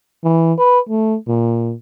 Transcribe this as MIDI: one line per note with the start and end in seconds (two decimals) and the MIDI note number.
0.24 0.53 52
0.59 0.79 71
0.89 1.17 57
1.28 1.74 46